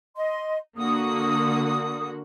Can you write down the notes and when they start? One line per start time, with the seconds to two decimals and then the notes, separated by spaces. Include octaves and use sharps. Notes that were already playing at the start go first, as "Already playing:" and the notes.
0.17 D#5 C6
0.78 D3 A#3 F#4 D#6